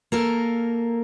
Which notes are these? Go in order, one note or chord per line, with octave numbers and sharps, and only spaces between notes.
A#3 A4 A#4